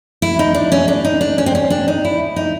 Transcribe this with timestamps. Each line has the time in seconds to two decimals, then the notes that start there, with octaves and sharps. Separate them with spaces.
0.22 E4
0.39 D#4
0.55 D4
0.72 C#4
0.88 D4
1.05 D#4
1.21 D4
1.38 C#4
1.46 C4
1.55 C#4
1.70 D4
1.88 D#4
2.05 E4
2.36 D#4